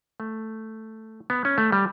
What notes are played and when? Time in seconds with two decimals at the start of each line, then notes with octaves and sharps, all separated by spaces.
0.20 A3
1.30 B3
1.45 C#4
1.58 A3
1.72 G3